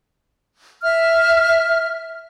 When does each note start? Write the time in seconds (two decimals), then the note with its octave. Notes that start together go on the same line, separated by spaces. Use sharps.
0.82 E5 F6